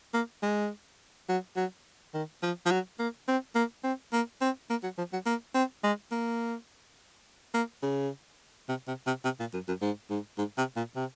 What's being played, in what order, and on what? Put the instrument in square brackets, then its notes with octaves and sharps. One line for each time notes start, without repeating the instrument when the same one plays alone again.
[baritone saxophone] A#3
G#3
F#3
F#3
D#3
F3
F3
F#3
A#3
C4
A#3
C4
A#3
C4
A#3
F#3
F3
F#3
A#3
C4
G#3
A#3
A#3
C#3
C3
C3
C3
C3
A#2
F#2
F#2
G#2
G#2
G#2
C3
A#2
C3